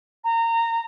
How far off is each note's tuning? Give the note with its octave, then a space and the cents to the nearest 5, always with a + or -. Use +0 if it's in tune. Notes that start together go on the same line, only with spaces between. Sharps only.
A#5 -20